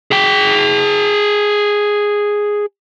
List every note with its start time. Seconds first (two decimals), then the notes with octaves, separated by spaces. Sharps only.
0.11 G#4 G5